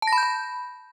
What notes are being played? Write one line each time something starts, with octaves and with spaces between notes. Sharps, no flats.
A5
A#6
B5
G6
B5